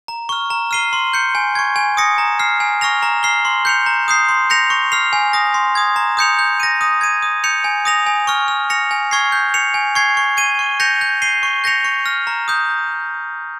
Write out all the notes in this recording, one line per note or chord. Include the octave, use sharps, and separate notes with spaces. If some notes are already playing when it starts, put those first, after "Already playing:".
A#5
C#6 F6
A#5
F6 C7 D#7 G7
C6
G6 C#7
G#5
C#6 G#6
G#5
D#6 A#6 C#7
A#5
F6 C7
G#5
C#6 F6 A#6 F7
A#5
F6 C7 G7
C6
G6 C#7 F7
A#5
D#6 G6 C7
C6
G6 A#6 C#7 F7
C#6
F6 C7 F7
G#5
D#6 A#6
C6
D#6 G#6
A#5
D#6 G6 C#7 F7
G6
A#6 D#7
D#6
G#6 D#7
D#6
G6 C#7 F7
G#5
D#6 A#6 F7
G#5
C#6 F6
F6
A#6 C#7 F7
G#5
C#6 F6 G#6 C7
G6
C#7 F7
G#5
C#6 G#6 C7
C#6
G#6 D#7 G7
C#6
G6 A#6 C#7 F7
G6
C7 D#7 G7
C#6
G6 A#6 C#7 F7
C#6
F6 A#6
A#5
D#6 G6